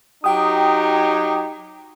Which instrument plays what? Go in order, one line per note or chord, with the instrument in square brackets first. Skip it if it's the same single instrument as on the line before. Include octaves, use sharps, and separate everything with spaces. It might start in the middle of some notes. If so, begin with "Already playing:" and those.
[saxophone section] F#3 G4 [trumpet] D#4 [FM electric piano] G5 D#6